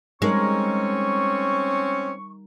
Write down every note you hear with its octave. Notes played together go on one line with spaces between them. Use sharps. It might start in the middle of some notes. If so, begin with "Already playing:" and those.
G3 G#3 C4 C#4 D#4 A#4 C#6